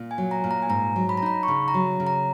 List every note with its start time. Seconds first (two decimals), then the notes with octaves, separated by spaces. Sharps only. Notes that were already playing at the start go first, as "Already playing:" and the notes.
Already playing: A#2
0.11 G#5
0.18 F#3
0.31 A#5
0.44 A#2
0.51 A#5
0.62 G#5
0.69 G#2 A#5
0.96 F#3
1.09 B5
1.17 A#5
1.22 D#4 B5
1.43 C#6
1.48 C#3 B5
1.68 A#5
1.74 F#3
2.00 C#3
2.07 A#5